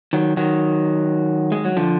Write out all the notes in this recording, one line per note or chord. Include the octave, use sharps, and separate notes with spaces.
D#3 F#3
D#3 F#3
G#3
F#3
D3 F3